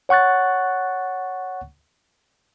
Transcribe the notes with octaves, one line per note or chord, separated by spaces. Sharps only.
C#5 F#5 C#6 F#6 A6